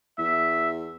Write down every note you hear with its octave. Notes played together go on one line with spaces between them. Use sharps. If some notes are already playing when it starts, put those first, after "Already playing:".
E2 E5